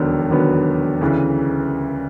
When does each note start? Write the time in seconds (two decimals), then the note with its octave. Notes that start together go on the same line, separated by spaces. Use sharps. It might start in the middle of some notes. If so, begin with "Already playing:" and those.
Already playing: E1 D#2 D3 F#3 B3
0.30 E1 D#2 D3 F#3 B3
1.01 D2 C#3 E3